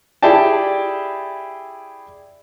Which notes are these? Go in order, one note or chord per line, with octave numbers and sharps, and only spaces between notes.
E4 G4 G#4 D5 G5 A5